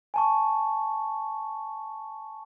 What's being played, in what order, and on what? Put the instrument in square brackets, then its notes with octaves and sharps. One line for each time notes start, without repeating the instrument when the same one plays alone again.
[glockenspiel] G#5 A5 C#6